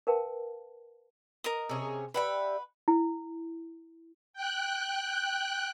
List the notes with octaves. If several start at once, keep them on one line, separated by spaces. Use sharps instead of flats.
A#4 B4 F5 G5 A5
A#4 D#5 D#6
C3 C#4 G#4
G4 B4 D5 E5 F#5 B5
E4
G5 F#6